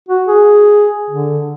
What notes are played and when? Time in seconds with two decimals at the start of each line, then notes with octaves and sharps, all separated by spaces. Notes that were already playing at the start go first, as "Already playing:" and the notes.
0.09 F#4
0.28 G#4
1.10 D3